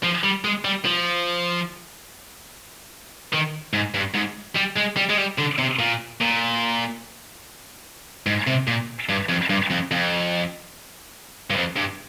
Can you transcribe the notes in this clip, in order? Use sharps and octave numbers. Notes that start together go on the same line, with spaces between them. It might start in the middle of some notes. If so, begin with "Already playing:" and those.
F3
G3
G#3
G3
F3
D#3
G#2
G2
G#2
G3
G#3
G3
G#3
G3
D3
C3
A#2
A#2
G#2
C3
A#2
G2
F2
G2
F2
F2
G2
F2
G2